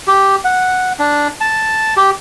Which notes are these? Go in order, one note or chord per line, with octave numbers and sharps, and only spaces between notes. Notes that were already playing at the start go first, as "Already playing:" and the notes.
G4
F#5
D4
A5
G4